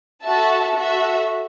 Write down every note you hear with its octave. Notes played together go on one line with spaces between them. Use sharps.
F#4 A4 E5 A5
F#4 A4 E5